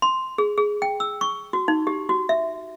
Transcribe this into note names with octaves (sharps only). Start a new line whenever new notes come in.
C6
G#4
G#4
G5
E6
C#6
F#4
D#4
G4
F#4
E5